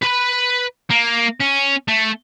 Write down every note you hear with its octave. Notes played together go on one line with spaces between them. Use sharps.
B4 B5
A#3
C#4
A3